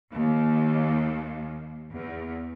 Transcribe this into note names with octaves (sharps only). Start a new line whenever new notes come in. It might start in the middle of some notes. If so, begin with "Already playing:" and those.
D#2
E2